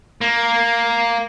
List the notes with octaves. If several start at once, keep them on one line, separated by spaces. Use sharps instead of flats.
A#3